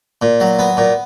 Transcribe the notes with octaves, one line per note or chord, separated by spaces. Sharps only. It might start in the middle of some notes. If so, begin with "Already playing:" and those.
A#2
F#3
B3
A#2